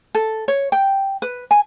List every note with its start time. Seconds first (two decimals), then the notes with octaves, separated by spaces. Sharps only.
0.15 A4
0.48 C#5
0.72 G5
1.22 B4
1.51 G#5